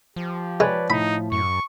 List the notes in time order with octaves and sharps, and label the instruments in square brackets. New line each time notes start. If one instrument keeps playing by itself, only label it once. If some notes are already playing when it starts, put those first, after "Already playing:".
[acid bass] F3 [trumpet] G4
[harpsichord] G#3 [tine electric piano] B4 C#5 D5
[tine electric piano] A2 [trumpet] D#4 [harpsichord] B5
[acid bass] F#2 [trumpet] C#6